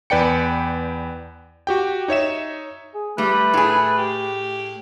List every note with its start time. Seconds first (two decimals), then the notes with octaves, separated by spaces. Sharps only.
0.10 E2 B4 D5 G5 C#7
1.67 F#4 G4 G5
2.08 D#4 C#5 E5 E7
2.94 G#4
3.18 G3 A3 B4
3.54 A2 G#4
3.98 G4